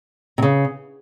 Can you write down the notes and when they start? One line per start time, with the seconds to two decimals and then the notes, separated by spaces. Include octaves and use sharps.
0.38 C3
0.42 C#3